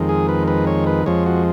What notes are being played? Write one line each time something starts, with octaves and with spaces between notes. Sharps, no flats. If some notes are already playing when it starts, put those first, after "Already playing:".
Already playing: F2 D#3 G#3
G#4
B4
B4
C#5
B4
F2 F3 G#3 C#5
F#4